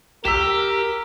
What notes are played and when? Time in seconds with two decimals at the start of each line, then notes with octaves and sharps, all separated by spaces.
0.25 G4 A#4 E6 B6 E7